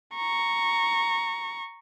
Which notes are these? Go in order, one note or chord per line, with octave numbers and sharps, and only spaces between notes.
A#5 C#6